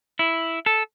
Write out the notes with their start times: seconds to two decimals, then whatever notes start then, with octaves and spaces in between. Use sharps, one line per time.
0.19 E4
0.66 A4